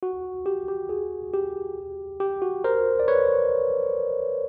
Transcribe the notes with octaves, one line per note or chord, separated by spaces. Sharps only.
F#4
G4
G4
F#4 G#4
G4
G4
F#4
A#4 C5
D5
B4 C#5